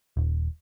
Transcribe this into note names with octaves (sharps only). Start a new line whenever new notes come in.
D#1